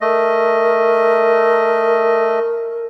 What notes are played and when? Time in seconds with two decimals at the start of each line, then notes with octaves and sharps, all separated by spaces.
0.01 A3 A#4 D#5